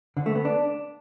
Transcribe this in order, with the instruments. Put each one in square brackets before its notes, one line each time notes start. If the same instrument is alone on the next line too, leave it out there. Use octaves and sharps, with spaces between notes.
[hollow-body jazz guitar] D3
A3
B3
D4